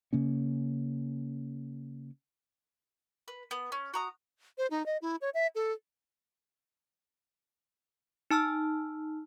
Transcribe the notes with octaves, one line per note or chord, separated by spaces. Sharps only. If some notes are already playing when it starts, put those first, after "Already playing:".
C#3 A#3 C#4
B4
B3
C#4
F#4 A#5 D#6
C5
D#4
D#5
E4
C#5
E5
A4
D#4 A5 E6 F6